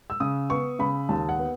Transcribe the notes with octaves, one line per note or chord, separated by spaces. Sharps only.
E6
C#3 D#6
B3 C#6
C#3 B5
D#2 A5
F#5
B3